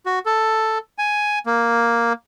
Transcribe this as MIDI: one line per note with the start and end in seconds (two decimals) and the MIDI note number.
0.06 0.19 66
0.26 0.78 69
0.98 1.39 80
1.46 2.13 58